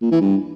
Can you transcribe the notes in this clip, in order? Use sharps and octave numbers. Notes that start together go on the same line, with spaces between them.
A#2
E3
G2